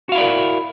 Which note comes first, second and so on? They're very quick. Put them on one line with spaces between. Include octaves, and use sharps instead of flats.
F#4 F5 E4 D5 A#4